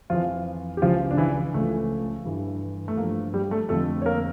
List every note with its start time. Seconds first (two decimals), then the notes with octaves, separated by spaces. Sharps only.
0.10 F2 E3 F3 F4
0.77 G4
0.81 C#2 C#3 E3 F3 F4
1.11 D4
1.17 E3 E4
1.54 C#2 C#3 F3 A3
2.25 G2 E3
2.88 A3
2.97 G2 F3 A#3
3.34 G3 G4
3.51 A3 A4
3.69 F2 D3 F3 A3 A4
4.02 C#5
4.06 A#3 A#4